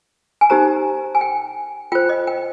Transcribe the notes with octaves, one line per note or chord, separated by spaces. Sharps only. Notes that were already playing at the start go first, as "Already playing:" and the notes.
G#5
D#4 G4 C5 A#5
G#5
G5
F4 C5 G5
D#5
G5